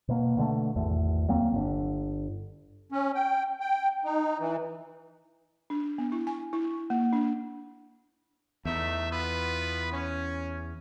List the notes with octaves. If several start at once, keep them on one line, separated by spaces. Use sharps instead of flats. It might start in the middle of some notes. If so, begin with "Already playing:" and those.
B2 A#3
B2 D3 G#3 A3
G#1 E2 A3
D2 F#3 A#3 C4
G1 D3
C#4
G5
G5
D#4
E3
D4
B3
E4
G#5
E4
A#3
D4
E2 A3 D#4 E5
B3 F4 B4
C#4